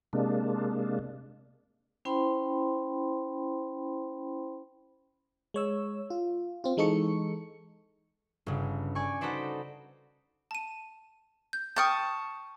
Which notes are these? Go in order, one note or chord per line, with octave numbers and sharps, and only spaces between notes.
C3 G#3 A#3 D4
C#4 E4 C5 G5 B5 C6
G#3 C#5 E6
F4
C4 F4
E3 G#3 D#4 A4 C#6 C#7
G1 C#3
D5 G#5 C#6
D#4 F#4 A4 B4 C5 D5
A5 D#7
G6
G5 A5 C#6 D#6 F6 G6